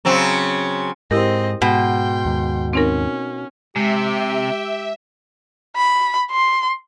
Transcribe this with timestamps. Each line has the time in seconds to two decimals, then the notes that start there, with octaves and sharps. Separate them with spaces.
0.05 C#3 F#3 C4
1.11 G#2 C4 E4 G4 A#4 D#5
1.62 G#2 B2 G5 C6
2.25 D#2 G#2
2.73 C4 C#4 D#4 A#4
3.76 C3 G#3 G4 E5
5.77 B5
6.31 C6